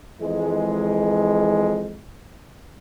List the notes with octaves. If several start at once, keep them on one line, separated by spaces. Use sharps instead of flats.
F2 E3 G#3